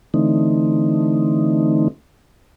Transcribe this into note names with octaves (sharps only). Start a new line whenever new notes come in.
D3 E3 A3 C4 D#4